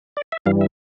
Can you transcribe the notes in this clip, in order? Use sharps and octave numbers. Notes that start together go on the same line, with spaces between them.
D5
E5
G2 E3 G3 F5
E5